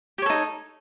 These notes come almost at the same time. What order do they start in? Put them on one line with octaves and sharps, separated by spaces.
G4 C#5 A4 D#4